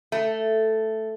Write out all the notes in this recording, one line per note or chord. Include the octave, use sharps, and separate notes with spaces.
A3